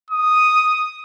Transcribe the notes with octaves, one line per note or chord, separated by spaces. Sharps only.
D#6